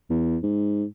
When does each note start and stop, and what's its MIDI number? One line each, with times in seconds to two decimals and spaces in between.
0.10 0.38 40
0.43 0.85 44